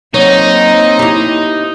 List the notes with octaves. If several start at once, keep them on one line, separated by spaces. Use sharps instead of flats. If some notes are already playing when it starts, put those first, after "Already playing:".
F#3 A#3 C4 D#4 C#5 D#5
E4 G4